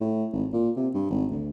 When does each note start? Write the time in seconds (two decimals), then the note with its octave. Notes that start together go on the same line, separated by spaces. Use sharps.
0.01 A2
0.33 G#1
0.53 A#2
0.77 C3
0.94 G2
1.10 G#1
1.31 D2